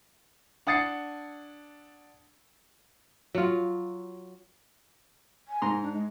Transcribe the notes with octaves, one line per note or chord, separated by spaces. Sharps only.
D4 F#5 D#6 A6 C7 C#7
F#3 F4
G#5
G#2 A#5 C6
D4
G#3